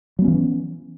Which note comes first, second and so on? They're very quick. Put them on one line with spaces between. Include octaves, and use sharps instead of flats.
F#3 B3 C#4 E3